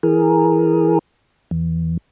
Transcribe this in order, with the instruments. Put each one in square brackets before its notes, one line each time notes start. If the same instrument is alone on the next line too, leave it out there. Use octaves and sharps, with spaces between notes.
[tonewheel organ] E3 G#4 A#4
E2